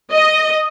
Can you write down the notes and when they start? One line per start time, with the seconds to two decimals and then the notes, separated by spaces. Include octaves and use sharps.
0.11 D#5